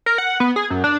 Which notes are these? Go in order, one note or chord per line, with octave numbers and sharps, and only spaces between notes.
A#4
F#5
B3
G#4
F#2
D4